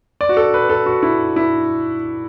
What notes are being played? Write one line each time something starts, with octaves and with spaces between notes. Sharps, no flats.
D5
F#4
A4
B4
A4
F#4
E4
E4